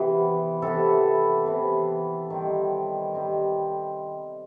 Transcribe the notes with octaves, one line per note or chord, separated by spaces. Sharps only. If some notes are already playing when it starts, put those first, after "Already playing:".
Already playing: C3 E3 B3
C3 E3 B3 A4
C3 E3 B3
D#3 G3 C4
D#3 G3 C4